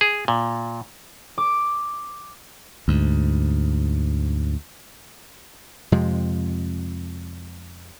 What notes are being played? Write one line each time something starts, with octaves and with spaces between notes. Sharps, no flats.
G#4
A#2
D6
D2 G#2
F2 C3 G#3